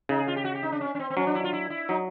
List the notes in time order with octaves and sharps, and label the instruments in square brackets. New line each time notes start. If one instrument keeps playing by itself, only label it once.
[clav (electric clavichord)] C#3 [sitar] D#4
[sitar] G#4
F4
G4
F#4
G4
D#4
D4
C#4
C#4
C4
C4
[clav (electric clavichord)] F#3 [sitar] C#4
[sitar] D4
E4
F4
E4
E4
[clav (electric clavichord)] F#3 [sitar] D#4